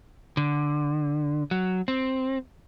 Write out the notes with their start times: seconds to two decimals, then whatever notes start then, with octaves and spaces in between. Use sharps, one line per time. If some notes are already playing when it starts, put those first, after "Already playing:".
0.37 D3
1.51 F#3
1.88 C4